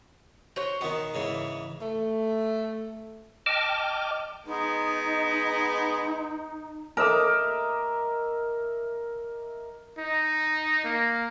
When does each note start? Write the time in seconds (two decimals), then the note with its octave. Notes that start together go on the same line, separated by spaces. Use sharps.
0.56 F#4 C5 C#5
0.81 B2 D#3 F#5 A#5
1.14 G#2 C#3 E3
1.82 A3
3.46 D#5 G5 A5 D6 F6
4.46 G#3 B3 D#4
6.97 A#4 D#5 E5 D6
9.99 D#4
10.84 A#3